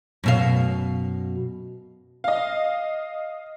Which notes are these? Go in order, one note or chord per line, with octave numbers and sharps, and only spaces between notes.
F#2 B2 F5
D#5 F5